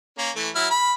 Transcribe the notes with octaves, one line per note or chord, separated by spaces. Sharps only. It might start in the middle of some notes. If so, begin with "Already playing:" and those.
A#3 C#4
E3 A3
F#3 E4 F6
B5